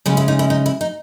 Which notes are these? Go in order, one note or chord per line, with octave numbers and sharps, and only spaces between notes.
C#3 G#3 C#4
E4
D#4
E4
D#4
E4
D#4